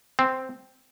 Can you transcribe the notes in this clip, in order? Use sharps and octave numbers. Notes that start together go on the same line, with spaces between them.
C4